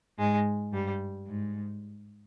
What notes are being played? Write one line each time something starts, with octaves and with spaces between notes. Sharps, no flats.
G#2 G#3
G2 G3
G#2